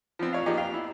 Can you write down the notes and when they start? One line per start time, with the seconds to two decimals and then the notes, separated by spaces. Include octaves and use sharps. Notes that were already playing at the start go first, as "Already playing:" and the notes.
0.19 F3 B3 C4
0.33 A1 C#5 F5
0.46 F3 A#3 B3 D#4 G4 G#4
0.57 F2 F5 G5
0.74 E4